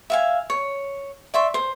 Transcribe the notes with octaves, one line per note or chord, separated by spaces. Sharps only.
E5 F5 G#5
C#5
D5 E5 C6 C#6
C5